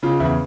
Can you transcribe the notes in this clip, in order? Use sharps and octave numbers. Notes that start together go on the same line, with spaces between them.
C#3 F4
E2 E4